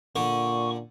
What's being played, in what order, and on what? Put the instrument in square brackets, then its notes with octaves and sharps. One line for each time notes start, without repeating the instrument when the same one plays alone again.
[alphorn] A#2 [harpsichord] D3 [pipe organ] C#6